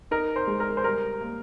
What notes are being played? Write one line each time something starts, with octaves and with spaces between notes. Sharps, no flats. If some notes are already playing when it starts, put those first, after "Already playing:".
D#4 A#4
C5
G#3
A#4
C5
G3 A#4
A#3